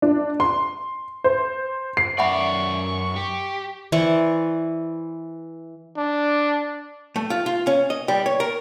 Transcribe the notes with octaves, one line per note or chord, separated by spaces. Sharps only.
D4
C6
C5
C7
F#2 D5 E5 F#5 B5 C#6
G4
E3 C5 D5 C#6
D4
A3
F4
F4
C#4
D#5
G3
C#5
A#4